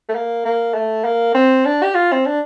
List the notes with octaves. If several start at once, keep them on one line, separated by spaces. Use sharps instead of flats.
A3
A#3
A#3
A3
A#3
C4
D4
G4
F4
C4
D4